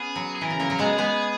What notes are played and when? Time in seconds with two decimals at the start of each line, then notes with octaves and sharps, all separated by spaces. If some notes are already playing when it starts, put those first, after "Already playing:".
Already playing: B3 C#4 G#4
0.16 F#3
0.35 G#4
0.41 E3 A#4
0.50 C#3
0.60 F#3 A#3
0.70 F#3 A#3
0.79 G#3 B3 G#4
0.98 G#3 B3